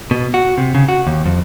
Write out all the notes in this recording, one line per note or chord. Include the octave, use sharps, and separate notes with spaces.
B2
F#4
C3
C#3
F#4
D#2
F2